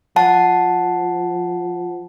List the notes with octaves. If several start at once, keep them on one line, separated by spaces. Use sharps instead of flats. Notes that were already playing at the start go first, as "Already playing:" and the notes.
F3 F#5 A5